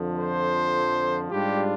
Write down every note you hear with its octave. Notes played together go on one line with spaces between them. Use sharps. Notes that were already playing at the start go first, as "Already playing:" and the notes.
Already playing: F2 D3 F3
C5
G#2 G3 D4 F4 G4